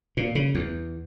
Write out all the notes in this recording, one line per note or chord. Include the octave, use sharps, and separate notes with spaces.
A#2
C#3
E2